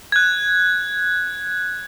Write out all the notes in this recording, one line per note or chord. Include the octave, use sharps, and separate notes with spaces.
F#6 G#6